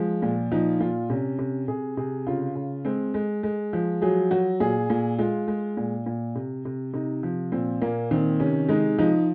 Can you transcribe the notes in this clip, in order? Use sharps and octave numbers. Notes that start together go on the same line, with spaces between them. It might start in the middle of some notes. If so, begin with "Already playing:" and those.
Already playing: F3 G#3
A#2
F3 D#4
A#2 F4
C3 C#4
C3
C3 G#4
C3 G#4
C#3 F4
C#3
G#3 C4
G#3
G#3
F3
F#3 G#4
F#3 F#4
A#2 G#4
A#2
G#3 F4
G#3
A#2
A#2
C3
C3
C3 D#4
F3
A#2 C4
A#2 A#3
D#3 C4
C3 C#4
G#3 D#4
F3 D#4